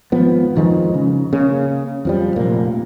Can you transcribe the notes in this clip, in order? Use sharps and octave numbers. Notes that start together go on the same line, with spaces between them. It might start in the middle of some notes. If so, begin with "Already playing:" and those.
G#1 F3 B3
F2 D#3 F3 G#3
C#3
C#3 A#3
F2 F3 G3
F1 A#2 A#3